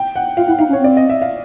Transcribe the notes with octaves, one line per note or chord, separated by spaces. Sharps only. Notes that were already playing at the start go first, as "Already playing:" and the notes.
Already playing: G5
F#5
F4 F5
E4 F#5
D#4 F5
C#4
C#5
C4 D5
D#5
E5
F5